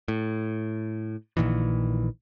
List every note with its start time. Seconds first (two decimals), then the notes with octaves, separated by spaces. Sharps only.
0.08 A2
1.37 A#1 A#2 D#3 E3